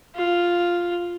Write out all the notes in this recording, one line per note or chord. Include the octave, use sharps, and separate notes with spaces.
F4